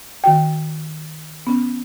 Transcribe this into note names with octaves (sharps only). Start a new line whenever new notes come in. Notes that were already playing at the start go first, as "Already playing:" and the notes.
D#3 F#4 G5
B3 C#4